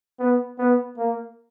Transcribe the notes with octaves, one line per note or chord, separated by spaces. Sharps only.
B3
B3
A#3